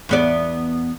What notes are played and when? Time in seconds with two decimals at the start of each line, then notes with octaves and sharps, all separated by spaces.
0.09 E2 B3 D5